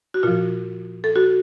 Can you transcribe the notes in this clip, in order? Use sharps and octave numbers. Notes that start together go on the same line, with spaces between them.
F#4
A#2 F3 F4
A4
F#4